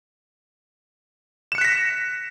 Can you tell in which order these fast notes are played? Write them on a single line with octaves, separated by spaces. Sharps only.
E7 C#7 F#6 B6 A#6